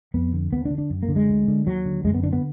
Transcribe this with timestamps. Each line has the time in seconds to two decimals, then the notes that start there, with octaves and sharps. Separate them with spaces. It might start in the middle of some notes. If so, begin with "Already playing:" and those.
0.14 F2 B3
0.33 D3
0.52 D#2 B3
0.65 D4
0.71 D3
0.78 D4
0.90 F#2
1.03 A#3
1.09 D3
1.16 G#3
1.29 D2
1.48 D3
1.66 D#2 F#3
1.86 D3
2.05 F#2 G#3
2.14 B3
2.23 D3 D4
2.33 B3